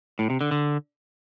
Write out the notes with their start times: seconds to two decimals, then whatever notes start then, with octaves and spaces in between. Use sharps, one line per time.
0.19 A2
0.30 C3
0.41 D3
0.51 D3